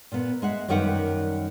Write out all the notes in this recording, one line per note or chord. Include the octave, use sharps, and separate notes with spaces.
A#2 B3
G#3 E5 F#5
F#2 D#3 G3 A#4 B4 F#5